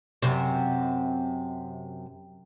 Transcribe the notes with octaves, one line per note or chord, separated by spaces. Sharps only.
F#2 C3